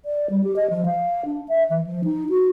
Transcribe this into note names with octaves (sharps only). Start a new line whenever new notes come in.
D5
G3
G4
D#5
F3
F5
D4
E5
E3
F3
D#4
F#4